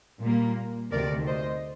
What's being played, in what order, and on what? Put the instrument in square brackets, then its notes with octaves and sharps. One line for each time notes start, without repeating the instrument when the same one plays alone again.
[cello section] A#2 G3 A#3
D2 C3 D#3 A#4 D5
C5 D#5